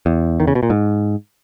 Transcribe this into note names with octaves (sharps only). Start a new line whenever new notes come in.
E2
D#3
C#3
B2
A#2
G#2